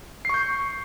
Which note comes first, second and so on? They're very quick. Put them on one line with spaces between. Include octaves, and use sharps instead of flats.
C7 C#6 G6